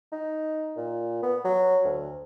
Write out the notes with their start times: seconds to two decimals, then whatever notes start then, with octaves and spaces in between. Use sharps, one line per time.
0.12 D#4
0.77 A#2
1.23 B3
1.45 F#3
1.84 D2